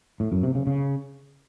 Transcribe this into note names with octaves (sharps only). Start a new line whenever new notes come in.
A2
F#2
C3
C#3
C#3